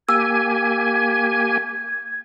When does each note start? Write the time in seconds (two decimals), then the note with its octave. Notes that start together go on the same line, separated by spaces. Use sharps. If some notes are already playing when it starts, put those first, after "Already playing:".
0.09 A#3 G4 G#5 E6 G#6